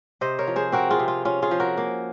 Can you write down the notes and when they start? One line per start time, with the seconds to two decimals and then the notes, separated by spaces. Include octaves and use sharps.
0.21 C3 C5 D#5
0.39 A#4 C#5
0.47 F3
0.56 G#4 C5
0.72 C4 F#4 A#4
0.91 F4 G#4
0.99 C3
1.08 F4
1.25 C#4 F4
1.42 F4 G#4
1.51 F3
1.60 F#4 A#4
1.77 A#3